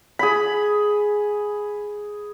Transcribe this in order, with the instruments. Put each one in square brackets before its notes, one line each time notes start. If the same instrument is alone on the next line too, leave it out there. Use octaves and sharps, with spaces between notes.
[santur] G#4 B5